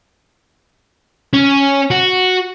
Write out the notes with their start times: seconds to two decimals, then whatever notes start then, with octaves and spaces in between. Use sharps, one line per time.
1.33 C#4
1.91 F#4